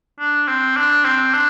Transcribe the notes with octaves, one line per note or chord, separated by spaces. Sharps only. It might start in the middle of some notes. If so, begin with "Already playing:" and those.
D4
C4
D4
C4
D4